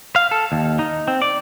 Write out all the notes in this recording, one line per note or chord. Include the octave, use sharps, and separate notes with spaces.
F5
A4
D#2
D#4
C4
D5